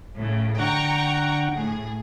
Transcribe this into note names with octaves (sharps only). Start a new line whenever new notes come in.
A2 C#3
D3 F#5 G5 A#5 C#6
A2 G#4